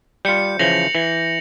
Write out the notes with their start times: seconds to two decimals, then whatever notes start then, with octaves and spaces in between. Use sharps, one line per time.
0.25 G3 F4 G6 C#7
0.59 C#3 E3 F3 A#6 F7 F#7
0.95 E3